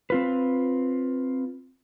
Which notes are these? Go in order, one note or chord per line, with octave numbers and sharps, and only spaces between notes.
C4 F4 B4